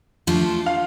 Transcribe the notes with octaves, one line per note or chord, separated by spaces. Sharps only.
F3 A3 D4 F4
F5